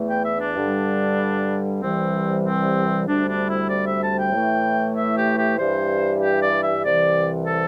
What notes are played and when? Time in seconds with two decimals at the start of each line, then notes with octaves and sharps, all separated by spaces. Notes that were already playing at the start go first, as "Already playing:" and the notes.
Already playing: E2 E3 A3
0.09 G5
0.25 E5
0.40 D4
0.56 G2 D3 G3
1.81 C2 C3 E3 G3 C4
2.44 C4
3.07 D2 C3 G3 D4
3.27 D4
3.49 E4
3.70 D5
3.86 E5
4.02 A5
4.17 G5
4.32 A2 E3 A3
4.96 E5
5.16 G4
5.38 G4
5.58 G2 E3 G3 C5
6.21 G4
6.42 D5
6.63 E5
6.84 C2 C3 E3 D5
7.46 A4